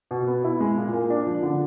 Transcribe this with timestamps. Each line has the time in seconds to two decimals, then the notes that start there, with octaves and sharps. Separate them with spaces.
0.11 B2
0.27 B3
0.44 E4
0.60 G#3
0.77 A#2
0.93 A#3
1.10 D4
1.27 F3
1.43 D3